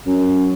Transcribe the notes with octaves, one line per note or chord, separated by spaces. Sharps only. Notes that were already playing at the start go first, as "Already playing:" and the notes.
F#2